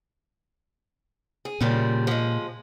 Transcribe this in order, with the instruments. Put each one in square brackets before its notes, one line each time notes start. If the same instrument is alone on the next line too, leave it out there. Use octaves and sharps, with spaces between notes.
[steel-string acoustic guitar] G#4
[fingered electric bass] A#2 [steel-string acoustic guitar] C#3 F3 G3
[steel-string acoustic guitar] F3 G#3